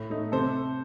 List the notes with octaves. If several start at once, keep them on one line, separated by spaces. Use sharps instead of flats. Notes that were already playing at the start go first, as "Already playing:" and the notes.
Already playing: A2
A3 D#4
C3 A4 C5